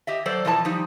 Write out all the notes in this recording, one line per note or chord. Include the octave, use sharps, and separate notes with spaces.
G4 D#5 E5
F#3 A4 C5 D5
B2 E3 F3 A#4 A5
F3 G3 D#4